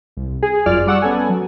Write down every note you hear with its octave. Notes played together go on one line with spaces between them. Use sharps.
C2
G#4
G1 F#2 F4 D5 F6
G3 D5 F#5 C#6 E6
B3 C#4 A4 G#5
F#3